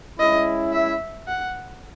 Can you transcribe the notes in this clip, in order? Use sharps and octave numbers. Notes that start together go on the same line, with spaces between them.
G#3 C#4 E4 D#5
E5
F#5